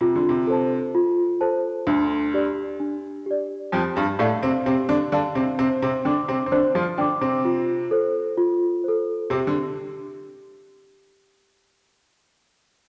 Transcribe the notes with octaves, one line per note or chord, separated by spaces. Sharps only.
C3 F4
D3
C3
A4 C5 A5
F4
A4 C5 A5
D2 D3 D4
G4 D5
D4
G4 D5
F2 F3 G4
G2 G3
A2 A3 D5 F5 A5
C3 C4
C3 C4 G4
D3 D4
D3 D4 D5 F5 A5
C3 C4
C3 C4 C5
C3 C4
D3 D4 G5 D6
C3 C4
C4
D3 D4 C5
F3 F4
D3 D4 G5 D6
C3 C4
F4
A4 C5
F4
A4 C5
C3 C4 G4
D3